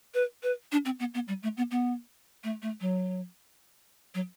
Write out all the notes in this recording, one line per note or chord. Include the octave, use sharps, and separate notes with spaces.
B4
B4
D4
C4
B3
B3
G3
A3
B3
B3
A3
A3
F#3
F#3